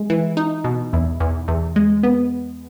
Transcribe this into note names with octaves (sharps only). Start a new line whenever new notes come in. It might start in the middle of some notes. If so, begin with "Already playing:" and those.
Already playing: G#3
E3
D#4
B2
E2
E2
E2
G#3
B3